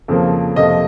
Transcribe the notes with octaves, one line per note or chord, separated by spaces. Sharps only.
F2 C#3 F3 A#3
F2 C3 F3 A#3 D#5